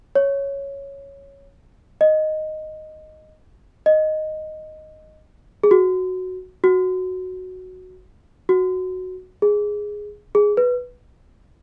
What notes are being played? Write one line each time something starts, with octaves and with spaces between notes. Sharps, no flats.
C#5
D#5
D#5
G#4
F#4
F#4
F#4
G#4
G#4
B4